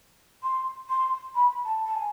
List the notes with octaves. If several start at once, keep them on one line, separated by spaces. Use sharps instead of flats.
C6
C6
B5
A5
A5
G#5